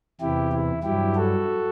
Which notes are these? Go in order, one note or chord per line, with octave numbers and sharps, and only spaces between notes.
E2 C3 E3 E4 G4
E4
G2 F#3 E4 G4
F#4 A4